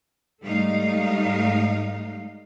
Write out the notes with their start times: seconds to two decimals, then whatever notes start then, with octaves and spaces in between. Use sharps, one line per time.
0.42 G#2 G3 A3 D#4 F5